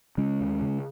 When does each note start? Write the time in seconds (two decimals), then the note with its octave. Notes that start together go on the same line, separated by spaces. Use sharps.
0.18 C#3 G#3 C#4
0.40 D#2
0.61 C#3